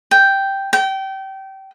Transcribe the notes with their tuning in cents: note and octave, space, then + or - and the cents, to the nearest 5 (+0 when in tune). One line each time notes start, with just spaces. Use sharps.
G5 +0
G5 -25